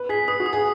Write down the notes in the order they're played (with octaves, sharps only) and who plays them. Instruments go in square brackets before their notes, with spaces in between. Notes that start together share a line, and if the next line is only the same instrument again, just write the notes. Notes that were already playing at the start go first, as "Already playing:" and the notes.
Already playing: [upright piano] B4
[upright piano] G#4 [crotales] B6
[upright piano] B4 [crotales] D#6
[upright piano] F#4
[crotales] D#6
[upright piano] G#4